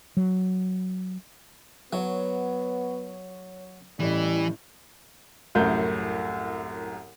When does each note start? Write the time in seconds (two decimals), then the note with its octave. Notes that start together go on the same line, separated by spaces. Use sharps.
0.17 F#3
1.93 F#3 B3 C#5
4.00 A1 A2 E3 G3
5.55 C2 F#2 A2 G6